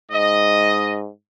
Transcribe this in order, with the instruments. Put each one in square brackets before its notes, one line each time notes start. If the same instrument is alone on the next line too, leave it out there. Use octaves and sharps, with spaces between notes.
[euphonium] G#2 [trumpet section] D#5